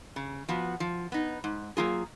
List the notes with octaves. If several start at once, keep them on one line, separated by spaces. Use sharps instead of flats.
C#3
F3 B3 F#4
F3
B3 D#4
G#2
F#3 A#3 F4 G#4